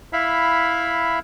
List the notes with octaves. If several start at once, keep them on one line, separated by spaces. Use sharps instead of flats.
E4 E5 F5 B5